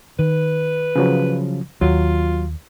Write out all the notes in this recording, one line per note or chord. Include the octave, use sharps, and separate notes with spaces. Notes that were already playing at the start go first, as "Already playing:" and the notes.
D#3 B4
C#3 F3 F#3
D#2 F#3 F4